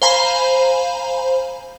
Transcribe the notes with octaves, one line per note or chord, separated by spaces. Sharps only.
C5 F5 G#5 A#5 B5